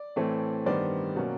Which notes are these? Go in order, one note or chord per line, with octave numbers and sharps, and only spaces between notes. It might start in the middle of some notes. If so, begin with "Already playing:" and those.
Already playing: D5
A2 E3 A3 C4
G2 D#3 G3 B3 C5 D5
B2 F#3 A#3 C#4